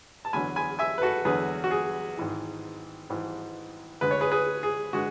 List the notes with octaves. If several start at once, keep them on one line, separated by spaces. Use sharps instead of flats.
A5
E2 D3 F#3 G#5 B5
G#5 B5
E5 G#5
B4
F#4 A4
E2 D3 F#3 G#4 B4
F#4
G#4
G#1 G#2 E3
G#1 G#2 E3
D2 D3 G#3 B4
C#5
G#4 B4
G#4 B4
G#4
D3 G#3 F#4